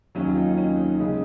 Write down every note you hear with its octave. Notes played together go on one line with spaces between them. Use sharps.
D#2 D#3 F#3 C#4
F4
D#4
C#4
D#4
C#3 G#3